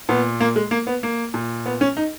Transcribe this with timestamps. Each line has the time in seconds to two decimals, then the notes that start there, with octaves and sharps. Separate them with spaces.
0.09 A#2 B3
0.40 A#3
0.56 G#3
0.71 A#3
0.87 B3
1.03 A#3
1.34 A#2
1.66 B3
1.81 C#4
1.97 D#4